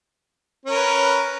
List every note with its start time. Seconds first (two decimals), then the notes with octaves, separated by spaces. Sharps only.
0.66 C#4
0.70 A#4
0.75 B4